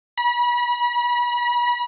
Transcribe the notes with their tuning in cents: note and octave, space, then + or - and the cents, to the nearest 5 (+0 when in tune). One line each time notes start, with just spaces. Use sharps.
B5 -35